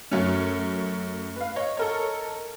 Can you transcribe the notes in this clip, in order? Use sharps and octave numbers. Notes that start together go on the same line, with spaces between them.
F#2 A3 C#4
B4 F5
C#5 D#5
A4 A#4 C#5